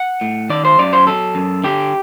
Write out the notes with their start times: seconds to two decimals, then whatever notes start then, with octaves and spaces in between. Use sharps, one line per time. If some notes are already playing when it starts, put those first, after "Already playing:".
Already playing: F#5
0.21 A2
0.50 D#3 D5
0.65 C5
0.78 F#2 D5
0.93 C5
1.07 F#3 A4
1.35 F#2
1.64 D3 G4